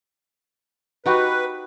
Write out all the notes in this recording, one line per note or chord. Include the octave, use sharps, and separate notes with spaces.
D#4 F#4 G4 B4